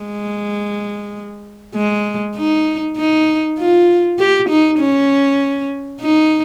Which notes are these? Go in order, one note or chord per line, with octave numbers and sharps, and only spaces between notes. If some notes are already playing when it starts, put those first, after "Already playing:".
Already playing: G#3
G#3
D#4
D#4
F4
G4
D#4
C#4
D#4